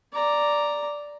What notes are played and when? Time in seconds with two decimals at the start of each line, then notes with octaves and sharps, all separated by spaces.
0.12 D5 A#5